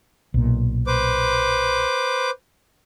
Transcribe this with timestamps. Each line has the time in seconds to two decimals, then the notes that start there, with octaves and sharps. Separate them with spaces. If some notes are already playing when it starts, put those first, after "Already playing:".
0.34 B1 A#2
0.87 B4 C5 D6